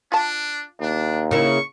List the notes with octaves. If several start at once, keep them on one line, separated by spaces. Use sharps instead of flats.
D4 F4 A5
D#2 D4
C#3 A#3 E4 C#6